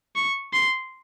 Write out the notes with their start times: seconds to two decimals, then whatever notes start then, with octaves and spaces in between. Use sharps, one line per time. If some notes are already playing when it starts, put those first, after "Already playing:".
0.16 C#6
0.54 C6